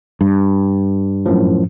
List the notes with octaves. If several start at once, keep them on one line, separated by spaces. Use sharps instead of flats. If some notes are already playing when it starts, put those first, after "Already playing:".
G2
F#2 A2 F3